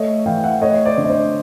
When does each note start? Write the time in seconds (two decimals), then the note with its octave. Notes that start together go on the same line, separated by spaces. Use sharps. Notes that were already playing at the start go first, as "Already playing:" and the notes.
Already playing: A3 C#5 D#5
0.26 E3 F5 G5
0.44 E5 F#5
0.62 A3 C#5 D#5
0.86 C5 D5
0.98 D3
1.04 D#5
1.10 C5 D5